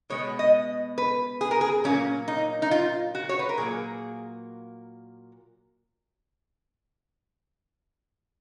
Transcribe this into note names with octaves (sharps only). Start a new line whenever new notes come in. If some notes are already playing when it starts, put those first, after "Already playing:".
B2 G#3 B3 C#5
D#5
B4
G#4
A#4
G#4
A#2 F#3 A#3 C#4
D#4
D#4
F4
F#4
C#5
B4
A#4
A#2 F#3 A#3 G#4